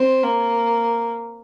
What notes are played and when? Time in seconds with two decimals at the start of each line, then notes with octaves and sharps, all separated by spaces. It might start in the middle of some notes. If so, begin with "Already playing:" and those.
Already playing: C4
0.23 A#3